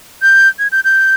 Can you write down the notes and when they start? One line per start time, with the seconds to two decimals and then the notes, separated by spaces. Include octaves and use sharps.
0.22 G6
0.59 G#6
0.72 G6
0.85 G6